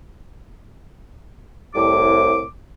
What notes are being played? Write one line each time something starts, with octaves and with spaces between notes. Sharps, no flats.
C2 A2 D6